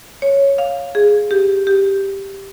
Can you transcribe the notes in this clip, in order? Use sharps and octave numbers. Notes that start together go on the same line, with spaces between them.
C#5
F5
G#4
G4
G4